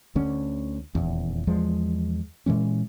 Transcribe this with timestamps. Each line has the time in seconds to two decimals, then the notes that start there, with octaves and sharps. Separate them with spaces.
0.15 D2 D3 C#4
0.95 D#1 E2
1.47 E2 F3 G#3
2.46 A#2 E3 G#3 C#4